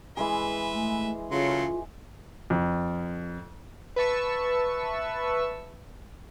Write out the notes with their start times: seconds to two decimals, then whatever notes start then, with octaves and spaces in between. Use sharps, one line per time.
0.17 E3 G#3 G#4 B4 E5
0.74 A3
1.31 C#3 F#3 A3 F4 C6
2.50 F2
3.96 B4 E5 A5 C#6 E6